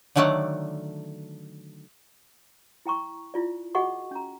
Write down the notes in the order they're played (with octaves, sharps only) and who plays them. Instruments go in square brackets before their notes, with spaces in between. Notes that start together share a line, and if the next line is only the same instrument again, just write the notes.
[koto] D3 D#3 F#3 A3 D5 F#5
[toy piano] E4 G5 A#5 C#6
E4 F4 D5
F#4 G#4 D#5 F#5 C#6
C#4 A#5